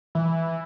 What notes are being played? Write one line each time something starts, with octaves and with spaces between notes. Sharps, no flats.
E3